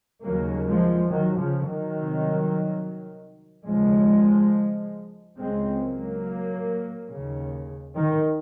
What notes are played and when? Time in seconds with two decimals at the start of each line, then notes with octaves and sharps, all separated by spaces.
0.23 D#2 C#3 F#3 A#3
0.67 F3 G#3
1.09 D#3 F#3
1.38 C#3 F3
1.66 D#3 F#3
1.96 C2 C3
3.66 D#2 C#3 F3 G#3
5.37 C#2 C#3 G#3 C4
5.80 F#3 A#3
7.09 D#2 C#3
7.95 D#3